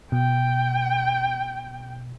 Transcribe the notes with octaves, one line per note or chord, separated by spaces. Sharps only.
B2 G5